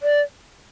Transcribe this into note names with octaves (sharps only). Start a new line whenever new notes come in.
D5